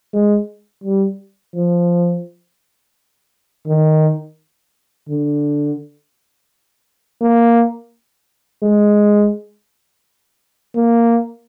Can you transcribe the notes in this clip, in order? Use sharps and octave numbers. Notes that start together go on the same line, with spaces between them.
G#3
G3
F3
D#3
D3
A#3
G#3
A#3